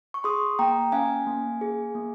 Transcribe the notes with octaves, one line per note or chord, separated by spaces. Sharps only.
C#6
G#4 C6 D#6
A#3 G5 A#5
C#4 F5 G#5
A#3
G#4
A#3